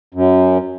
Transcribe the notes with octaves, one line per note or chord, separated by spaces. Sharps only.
F#2